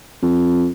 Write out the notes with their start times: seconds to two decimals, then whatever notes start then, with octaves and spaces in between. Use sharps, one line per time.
0.22 F2